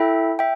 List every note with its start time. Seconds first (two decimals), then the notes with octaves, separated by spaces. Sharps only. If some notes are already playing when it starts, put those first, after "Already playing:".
Already playing: E4 A4 E5 G5
0.39 E5 G5